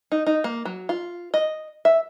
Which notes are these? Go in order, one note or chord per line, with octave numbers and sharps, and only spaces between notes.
D#4
D#4
A#3
F#3
F4
D#5
E5